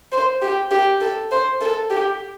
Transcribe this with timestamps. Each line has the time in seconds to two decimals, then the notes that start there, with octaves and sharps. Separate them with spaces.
0.12 C5
0.42 G4
0.71 G4
1.01 A4
1.31 C5
1.61 A4
1.91 G4